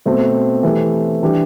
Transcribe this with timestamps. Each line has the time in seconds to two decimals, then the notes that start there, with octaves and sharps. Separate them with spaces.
0.06 B2 A3 C4
0.63 E3 A3 C4 G4
1.22 E3 G3 D4 G4